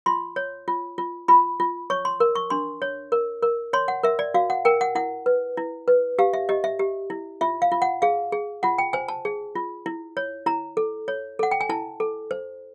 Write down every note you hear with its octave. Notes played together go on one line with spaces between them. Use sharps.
F4 C6
C#5
F4
F4
F4 B5
F4
C#5 C#6
C6
A#4
C#6
D4 C6
C#5
A#4
A#4
C#5 C6
F#5
A#4 E5
D5
F#4 F5
F#5
A#4 G5
F#5
E4 F#5
B4
E4
B4
G4 F5
E5
G4 D#5
E5
G4
E4
F4 E5
F5
F4
F#5
G#4 F5
G#4
F4 F#5
G5
C5 G#5
A5
G#4
F4
E4
C#5
E4 A#5
A4
C#5
A4 F#5
G5
G#5
E4 A5
A4
C5